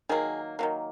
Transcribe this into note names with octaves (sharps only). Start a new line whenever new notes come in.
D#3 F#3 A#3 G#4
D#3 F#3 A#3